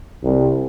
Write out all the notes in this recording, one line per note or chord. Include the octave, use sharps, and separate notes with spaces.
C2